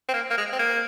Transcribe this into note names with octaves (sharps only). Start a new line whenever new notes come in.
C4
A#3
A#3
G#3
C4
A#3